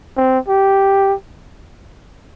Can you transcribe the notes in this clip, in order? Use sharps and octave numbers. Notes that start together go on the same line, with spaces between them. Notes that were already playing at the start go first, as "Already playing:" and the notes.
C4
G4